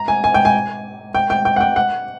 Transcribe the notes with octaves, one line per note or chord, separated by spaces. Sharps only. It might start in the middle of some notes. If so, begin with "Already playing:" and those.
Already playing: A#5
G#5
G#5
G5
G#5
G5
G5
G5
F#5
G5
F#5